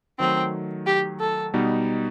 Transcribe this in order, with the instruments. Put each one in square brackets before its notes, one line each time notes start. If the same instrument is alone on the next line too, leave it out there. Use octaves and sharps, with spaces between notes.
[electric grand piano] D#3 F#3 A3 [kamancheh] C4
[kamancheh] G4
A4
[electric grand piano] B2 G3 B3 D#4